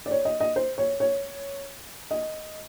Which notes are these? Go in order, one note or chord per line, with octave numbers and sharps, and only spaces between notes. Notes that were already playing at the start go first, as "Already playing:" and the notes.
D5
C#5
D#5
D#5
C5
C#5
C#5
D#5